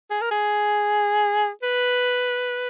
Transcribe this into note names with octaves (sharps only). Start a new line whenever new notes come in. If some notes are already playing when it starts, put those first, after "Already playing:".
G#4
A#4
G#4
B4